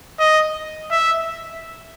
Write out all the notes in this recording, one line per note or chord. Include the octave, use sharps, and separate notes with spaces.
D#5
E5